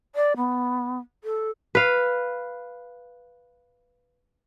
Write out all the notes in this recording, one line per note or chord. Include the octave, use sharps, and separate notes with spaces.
D5
B3
A4
B4 F5